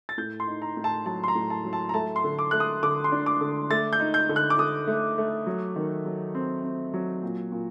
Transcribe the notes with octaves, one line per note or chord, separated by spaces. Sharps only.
A6
A2 G6
C6
D#4
A#5
A2
A5
F#3 A5
C6
A#5
A2
A5
F#3
A5
A#5
A3 A5
C6
D3
D6
A3 F#6
D#6
D3 D6
C6
D4
D6
D3
A3 A6
G6
D#4
G6
D3
F#6
D6
D3 D#6
A3
A3
F#3
D#3
F#3
C4
C4
F#3
A#2
A#2